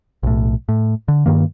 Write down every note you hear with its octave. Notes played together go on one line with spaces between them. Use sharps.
B1 A2
A2
D3
G2 D#3 A#3